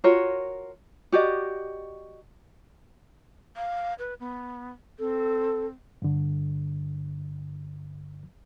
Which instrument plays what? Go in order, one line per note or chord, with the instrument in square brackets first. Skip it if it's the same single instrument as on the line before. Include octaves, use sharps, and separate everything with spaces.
[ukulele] F4 F#4 A#4 C#5
F#4 G4 D5 D#5
[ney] F5
B4
B3
[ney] C4 [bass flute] A4
[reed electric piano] G2 D3